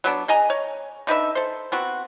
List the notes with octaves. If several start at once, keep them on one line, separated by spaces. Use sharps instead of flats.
F#3 B3 D4
G#4 D#5 G#5 A#5
C#5
D3 D#4 B4 E5
A4 C5
B3 C4 F#4